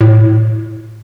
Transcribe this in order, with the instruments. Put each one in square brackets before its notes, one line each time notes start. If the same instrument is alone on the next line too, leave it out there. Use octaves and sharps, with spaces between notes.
[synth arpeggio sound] A2